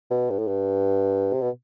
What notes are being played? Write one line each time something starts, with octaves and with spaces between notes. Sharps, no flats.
B2
G2
A2
G2
C3
B2